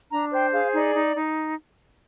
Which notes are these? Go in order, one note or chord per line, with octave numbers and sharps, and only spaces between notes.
D4 A#5
C5 G5
G#4 F5
D#4 D5
D#4
D#4